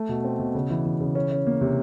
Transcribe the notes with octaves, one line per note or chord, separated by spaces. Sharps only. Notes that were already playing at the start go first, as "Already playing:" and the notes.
Already playing: A3
B2
C4
B2
C#3
E3
E3
C#3
C#4
C#4
A#3
C3